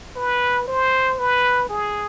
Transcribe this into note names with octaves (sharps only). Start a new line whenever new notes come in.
B4
C5
B4
G#4